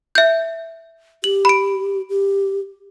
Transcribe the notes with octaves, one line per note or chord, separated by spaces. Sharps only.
E5 G6
G4 F#7
B5 D7
G4